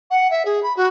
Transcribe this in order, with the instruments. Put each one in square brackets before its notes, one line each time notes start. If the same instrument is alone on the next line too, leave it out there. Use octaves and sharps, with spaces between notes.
[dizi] F#5
E5
G#4
B5
F#4